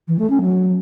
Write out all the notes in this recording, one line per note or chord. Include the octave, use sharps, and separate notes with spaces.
E3
A3
C#4
F#3